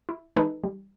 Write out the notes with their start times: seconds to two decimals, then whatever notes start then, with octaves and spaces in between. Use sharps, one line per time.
0.09 E4
0.36 E3 G#3 D#4 G#4 A4 B4
0.63 G3